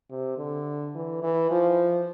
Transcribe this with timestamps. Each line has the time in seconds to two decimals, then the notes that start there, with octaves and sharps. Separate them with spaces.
0.10 C3
0.38 D3
0.95 E3
1.23 E3
1.51 F3